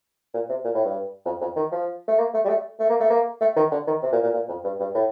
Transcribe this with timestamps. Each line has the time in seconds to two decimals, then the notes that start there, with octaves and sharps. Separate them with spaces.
0.34 A#2
0.49 C3
0.65 A#2
0.75 A2
0.85 G2
1.26 F2
1.41 F2
1.56 D#3
1.72 F3
2.08 A3
2.18 A#3
2.34 A3
2.45 G3
2.49 A3
2.80 A3
2.90 A#3
3.00 A3
3.10 A#3
3.41 A3
3.56 D#3
3.72 D3
3.87 D#3
4.03 C3
4.13 A#2
4.23 A#2
4.33 A#2
4.49 F2
4.64 G2
4.80 G2
4.95 A2